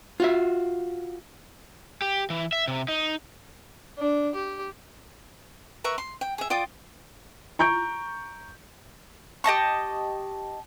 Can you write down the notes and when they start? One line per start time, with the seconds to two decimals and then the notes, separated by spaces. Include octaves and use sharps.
0.20 F4 F#4 E5
2.02 G4
2.30 E3
2.53 E5
2.68 C3
2.88 D#4
3.99 D4
4.35 G4
5.84 A#4 B4 E5 C#6
5.98 C6
6.21 G5
6.38 G#4 E5
6.50 F4 D5 G5 D#6
7.59 A#5 C#6 G6 D7
9.44 G4 D#5 A5 C#6